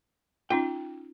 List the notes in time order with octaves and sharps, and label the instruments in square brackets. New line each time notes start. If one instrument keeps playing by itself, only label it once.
[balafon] C#4 D#4 F4 [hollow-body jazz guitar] G5